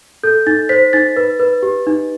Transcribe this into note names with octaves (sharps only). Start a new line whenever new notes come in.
A4 G6
D#4 A6
C5 B6
D#4 A6
B4
B4
G4
D#4